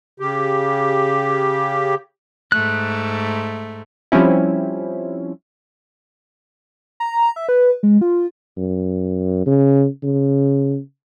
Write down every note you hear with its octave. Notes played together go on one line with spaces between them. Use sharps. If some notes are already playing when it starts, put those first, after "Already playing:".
C#3 G4
G#2 A3 F#6
F3 G3 C4 C#4 E4
A#5
E5
B4
G#3
F4
F#2
C#3
C#3